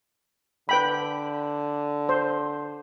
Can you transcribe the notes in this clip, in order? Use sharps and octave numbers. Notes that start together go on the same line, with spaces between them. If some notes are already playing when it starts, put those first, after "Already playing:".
D3 B4 G5 B5
C5